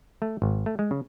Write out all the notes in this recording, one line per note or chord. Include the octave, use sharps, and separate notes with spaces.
A3
G#1
A3
G#3
C#3